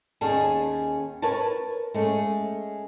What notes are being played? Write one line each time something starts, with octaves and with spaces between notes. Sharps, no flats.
D#2 C#4 G#4 D5 F5 A5
A#4 B4 C#5 A5
G#3 A3 C#4